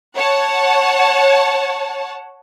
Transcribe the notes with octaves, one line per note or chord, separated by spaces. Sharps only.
C#5 F#5 A5